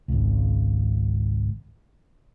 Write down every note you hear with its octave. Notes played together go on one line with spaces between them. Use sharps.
G#1 C#2